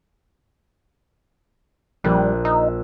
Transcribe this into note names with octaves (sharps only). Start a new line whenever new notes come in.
A#1 G3 F#6
D#4 E6